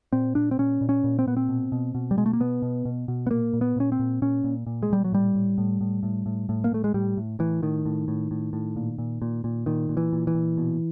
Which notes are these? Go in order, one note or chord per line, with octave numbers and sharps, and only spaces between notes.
A#2 C4
A#2 D4
C4
A#2 C#4
A#2
C#4
A#2
C4
A#2 B3
C4
B2
B2
B2
G3
B2 G#3
A3
A#3
B2 B3
B2
B2
B2
B3
A#2 A#3
A#2
B3
A#2 C#4
C4
A#2
A#2 C#4
A#2
A#2
G#3
A#2 G3
F#3
A2 G3
A2
A2
A2
A2
A2
A2
A#3
A2 A3
G#3
A2 G3
A2
A2 E3
A2 D#3
A2
A2
A2
A2
A#2
A#2
A#2
A#2
A#2 D#3
A#2
E3
A#2
E3
A#2
B2